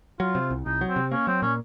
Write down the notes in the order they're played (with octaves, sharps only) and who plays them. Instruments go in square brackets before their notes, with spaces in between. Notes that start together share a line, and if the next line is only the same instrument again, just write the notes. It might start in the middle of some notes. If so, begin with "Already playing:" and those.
[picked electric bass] F#3 [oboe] F4
[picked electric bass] C3
C2
[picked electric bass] C2 [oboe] D#4
[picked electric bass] F#3
[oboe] C4
[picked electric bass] C3
[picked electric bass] A#3 [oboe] C#4
[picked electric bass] F#3 [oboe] C4
[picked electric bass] A#2 [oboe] C#4